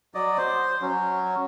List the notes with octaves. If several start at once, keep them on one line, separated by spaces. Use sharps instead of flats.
F#3 D5 D#5
C5
F#3 C#4